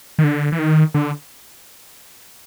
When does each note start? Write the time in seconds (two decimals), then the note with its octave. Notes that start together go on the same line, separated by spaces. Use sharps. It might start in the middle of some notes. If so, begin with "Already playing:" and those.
0.19 D#3
0.24 D3
0.52 E3
0.59 D#3
0.94 D3